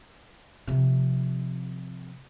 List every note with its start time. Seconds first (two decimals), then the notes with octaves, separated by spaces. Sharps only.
0.67 C3 F3